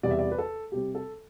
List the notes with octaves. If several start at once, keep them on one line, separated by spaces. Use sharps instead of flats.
E2 C3 G3 B3 D5
E5
D5
B4
A4
C3 G3 C4 G4
A4